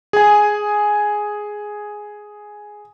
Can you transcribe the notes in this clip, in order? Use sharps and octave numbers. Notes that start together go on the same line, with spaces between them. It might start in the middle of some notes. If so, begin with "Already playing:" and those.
G#4 G#5